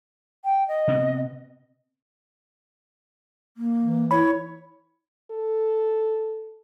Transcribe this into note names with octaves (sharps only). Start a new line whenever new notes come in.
G5
D#5
C3 B3
A#3
E3
E4 C#5 B5
A4